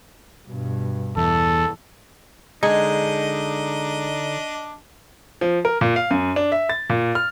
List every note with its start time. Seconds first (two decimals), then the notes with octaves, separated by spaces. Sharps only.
0.49 G2 B2
1.17 E2 A4
2.63 D3 G#3 D4 D#4 D#5
5.41 F3
5.65 A#4
5.81 A#2
5.96 F5
6.11 F#2
6.36 D4
6.52 E5
6.69 A6
6.90 A#2
7.15 F6